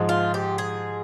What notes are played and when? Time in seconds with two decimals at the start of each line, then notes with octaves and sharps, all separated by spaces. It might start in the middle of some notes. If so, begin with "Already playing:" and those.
Already playing: G#2 F3 G#3
0.09 F4
0.34 G4
0.58 G#4